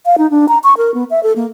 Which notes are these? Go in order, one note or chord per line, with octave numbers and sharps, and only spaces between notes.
F5
D#4
D4
A#5
C#6
A#4
B3
E5
A4
A#3